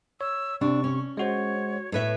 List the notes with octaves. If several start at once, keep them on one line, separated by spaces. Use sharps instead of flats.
C#5 E6
C3 C4 D4 C#6
C#4
G#3 F#4 C5 C#5
A2 B4 C#5 E5